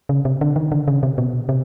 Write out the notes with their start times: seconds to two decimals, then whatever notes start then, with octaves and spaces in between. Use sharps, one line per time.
0.09 C#3
0.25 C3
0.41 D3
0.56 D#3
0.72 D3
0.88 C#3
1.03 C3
1.18 B2
1.49 C3